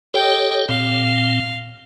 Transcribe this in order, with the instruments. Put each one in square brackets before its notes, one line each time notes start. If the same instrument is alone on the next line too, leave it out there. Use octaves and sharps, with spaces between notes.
[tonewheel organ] G4 A4 C#5 [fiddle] D#5 G5
[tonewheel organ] A#2 C4 [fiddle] F5